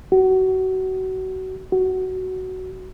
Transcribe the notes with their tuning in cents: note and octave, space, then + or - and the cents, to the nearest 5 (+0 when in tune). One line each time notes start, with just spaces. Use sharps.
F#4 +25
F#4 +10